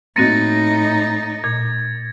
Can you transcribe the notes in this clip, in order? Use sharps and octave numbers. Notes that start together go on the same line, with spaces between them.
A2 A#3 C4 D#4 F#4 A6 A#6 C#7
A#2 G#6